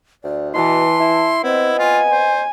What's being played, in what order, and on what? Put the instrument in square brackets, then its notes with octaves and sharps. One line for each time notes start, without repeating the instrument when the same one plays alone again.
[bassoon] D2 [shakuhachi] D5
[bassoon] B2 [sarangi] E3 [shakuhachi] A5 [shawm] C6
[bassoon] E4
[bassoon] B3 [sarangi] C4 [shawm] E4 [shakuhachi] D#5
[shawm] F4 [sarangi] G#5
[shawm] C5